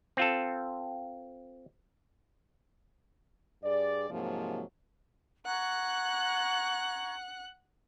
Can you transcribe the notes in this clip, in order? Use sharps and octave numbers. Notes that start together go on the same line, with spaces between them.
C4 F4 A4
G2 G#4 D5
G#2 C3 F3 F#3 A#3
F#5 A#5 C#6 F#6 G#6